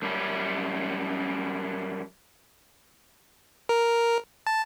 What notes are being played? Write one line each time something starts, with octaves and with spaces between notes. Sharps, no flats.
F#2 G3 C#4
A#4
A5